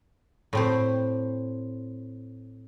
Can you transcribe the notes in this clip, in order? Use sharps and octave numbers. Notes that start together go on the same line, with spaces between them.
A2 C4 C5